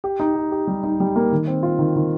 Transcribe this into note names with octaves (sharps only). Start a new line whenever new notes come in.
G4
D#4
G4
G4
G3
D#4
G3
A#3
D#3
C4
F4
D#3
D#3